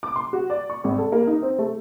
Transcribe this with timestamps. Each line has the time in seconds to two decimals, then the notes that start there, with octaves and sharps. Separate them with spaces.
0.03 D6
0.16 C6
0.33 F#4
0.50 D5
0.70 C#6
0.84 G#1
0.99 A4
1.12 A#3
1.27 D#4
1.43 C4
1.59 A3